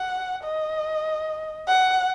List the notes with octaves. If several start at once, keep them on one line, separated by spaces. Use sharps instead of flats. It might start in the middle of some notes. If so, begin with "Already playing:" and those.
Already playing: F#5
D#5
F#5